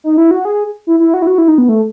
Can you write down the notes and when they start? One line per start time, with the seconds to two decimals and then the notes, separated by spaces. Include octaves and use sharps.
0.04 D#4
0.17 E4
0.31 F#4
0.45 G#4
0.87 E4
1.00 E4
1.14 F#4
1.22 E4
1.27 F#4
1.38 E4
1.48 D#4
1.58 B3
1.69 A3